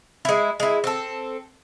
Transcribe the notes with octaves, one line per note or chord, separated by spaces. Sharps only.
G#3 E4
G#3 E4
C4 A4